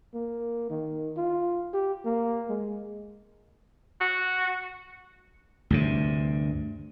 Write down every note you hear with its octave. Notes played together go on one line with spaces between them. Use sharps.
A#3
D#3
F4
G4
A#3
G#3
F#4
D2 G2 C3